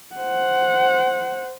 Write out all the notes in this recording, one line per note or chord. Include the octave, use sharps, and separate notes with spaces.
C5 F#5